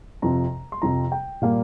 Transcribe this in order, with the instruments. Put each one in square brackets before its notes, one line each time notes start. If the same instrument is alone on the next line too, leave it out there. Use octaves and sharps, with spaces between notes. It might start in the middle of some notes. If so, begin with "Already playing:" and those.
[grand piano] F2 C3 F3 A#5
C6
F2 C3 F3 A#5
G5
A#2 G3 A#3 F5